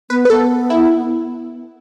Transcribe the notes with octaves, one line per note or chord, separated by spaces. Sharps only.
B3 B4
B4
B3 A4
E4